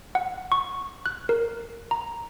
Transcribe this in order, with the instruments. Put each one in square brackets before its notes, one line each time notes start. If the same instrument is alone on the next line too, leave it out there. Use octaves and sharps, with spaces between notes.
[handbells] F#5
C#6
F#6
A#4
A#5